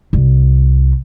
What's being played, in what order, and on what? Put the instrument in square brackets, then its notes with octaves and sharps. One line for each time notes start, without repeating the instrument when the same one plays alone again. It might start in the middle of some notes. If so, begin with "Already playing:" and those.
[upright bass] C2